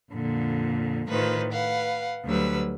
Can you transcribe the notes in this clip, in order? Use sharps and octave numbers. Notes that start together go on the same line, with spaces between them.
F2 A#2 D3
A2 D#3 A3 F4 B4 C5
B4 F5 F#5
D2 F#3 G3 B4 E6